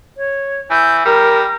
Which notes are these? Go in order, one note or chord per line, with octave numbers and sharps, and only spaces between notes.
C#5
E3 G6
G3 A#4